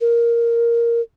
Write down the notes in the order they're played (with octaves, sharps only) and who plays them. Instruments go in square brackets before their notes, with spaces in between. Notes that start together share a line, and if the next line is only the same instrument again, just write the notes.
[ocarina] A#4